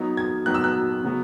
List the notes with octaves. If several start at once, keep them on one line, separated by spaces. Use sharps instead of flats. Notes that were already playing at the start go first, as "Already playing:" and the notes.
Already playing: F#3 B3 D#4
G#6
F#3 B3 D#4 F#6
E6
F#6
C#3 F#3 B3